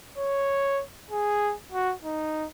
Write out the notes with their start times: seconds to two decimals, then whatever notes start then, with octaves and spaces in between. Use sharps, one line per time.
0.18 C#5
1.11 G#4
1.72 F#4
2.03 D#4